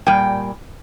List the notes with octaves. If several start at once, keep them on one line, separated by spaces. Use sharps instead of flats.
A#2 G3 G5